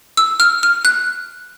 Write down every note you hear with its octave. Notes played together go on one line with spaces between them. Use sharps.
E6
F6
F6
F#6